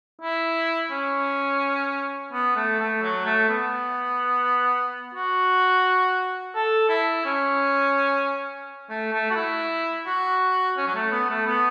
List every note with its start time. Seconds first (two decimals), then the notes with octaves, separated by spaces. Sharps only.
0.21 E4
0.91 C#4
2.32 B3
2.56 A3
2.80 A3
3.02 F#3
3.25 A3
3.49 B3
5.14 F#4
6.55 A4
6.89 E4
7.25 C#4
8.89 A3
9.13 A3
9.30 F#4
9.35 E4
10.07 F#4
10.77 C#4
10.87 F#3
10.95 A3
11.11 B3
11.29 A3
11.46 B3